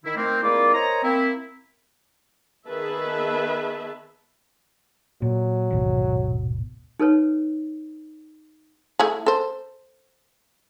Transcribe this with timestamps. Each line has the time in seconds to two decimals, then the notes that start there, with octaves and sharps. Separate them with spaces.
0.04 D#3 E4
0.16 D#3 A3 A#3 C4
0.43 G#3 A#3 C4 E4 F4 D5
0.73 A#4 C5 C#5 D#5 A#5
1.03 A#3 C4 E4
2.67 D#3 B3 G#4 B4 E5 A5
5.22 A#2 F#3
5.70 D#1 G#1 B2
6.99 D#4 A4 B4 C#5
8.99 A3 E4 G#4
9.26 A4 C5